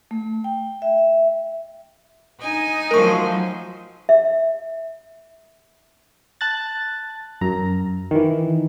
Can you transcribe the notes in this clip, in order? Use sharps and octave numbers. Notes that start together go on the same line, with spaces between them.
A3
G5
E5
D#4 G#5
F3 F#3 A3 A#4 C#6
E5
A5 F#6 A6
F#2 A#5
D#3 E3